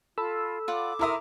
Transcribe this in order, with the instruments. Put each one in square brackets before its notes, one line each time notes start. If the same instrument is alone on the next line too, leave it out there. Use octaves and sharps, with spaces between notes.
[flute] F4 [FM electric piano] A4 B5 E6
[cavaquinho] F4 D5 F#5 [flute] D6
[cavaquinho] D#4 C6 D#6 [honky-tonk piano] E4 A#4 E5